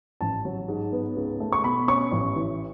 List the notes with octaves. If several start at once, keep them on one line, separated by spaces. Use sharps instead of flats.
A1 A5
F#3
G#2
B3
C#2
A3
C#6
B2 B5
C#4 C#6
A1
E3